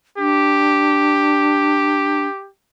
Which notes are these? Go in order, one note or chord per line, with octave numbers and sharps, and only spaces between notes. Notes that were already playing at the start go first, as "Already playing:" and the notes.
D4 G4